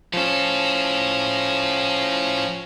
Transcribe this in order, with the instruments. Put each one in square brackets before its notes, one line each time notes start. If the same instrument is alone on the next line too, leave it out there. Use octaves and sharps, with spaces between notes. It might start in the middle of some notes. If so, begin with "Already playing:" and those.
[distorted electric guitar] A2 A4 [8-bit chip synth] F3 C#4